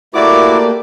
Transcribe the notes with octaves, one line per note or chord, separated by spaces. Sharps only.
A3 A#3 E4 F#4 G4 A#4 D5 D6